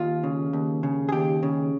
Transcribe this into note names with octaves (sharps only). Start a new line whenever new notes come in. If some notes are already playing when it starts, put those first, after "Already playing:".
Already playing: D#2 F4
C#3
D#2
C#3
G#4
D#2 G4
C#3